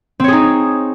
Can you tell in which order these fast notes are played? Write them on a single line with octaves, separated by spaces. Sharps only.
C4 C#5 G#4 D#4